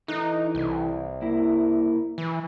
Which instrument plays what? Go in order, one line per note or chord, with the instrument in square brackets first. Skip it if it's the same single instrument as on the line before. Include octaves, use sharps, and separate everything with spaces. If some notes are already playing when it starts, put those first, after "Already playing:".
[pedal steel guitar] E3 A4 F#6 [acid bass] D#4
[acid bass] C2
[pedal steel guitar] A#3 E4
[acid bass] E3